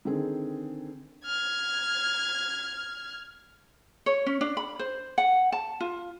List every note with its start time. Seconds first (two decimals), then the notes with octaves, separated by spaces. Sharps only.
0.05 D3 D#3 C4 G#4
1.26 F6 G#6
4.06 C#5
4.26 C#4
4.41 D4
4.57 B5
4.79 C5
5.18 F#5
5.52 A5
5.81 F4